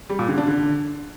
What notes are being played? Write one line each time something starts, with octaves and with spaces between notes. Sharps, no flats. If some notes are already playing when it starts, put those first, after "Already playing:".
G3
A#2
D3
D4
D3